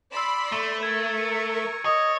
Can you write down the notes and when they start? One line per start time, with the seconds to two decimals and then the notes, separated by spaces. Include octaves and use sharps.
0.12 D5 B5 C6 E6 E7
0.52 A3
0.83 A#4 C#6 G#6 A6
1.18 C#7 D#7
1.85 C#5 D#5